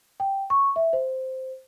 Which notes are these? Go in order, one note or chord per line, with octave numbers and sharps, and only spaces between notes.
G5
C#6
E5
C5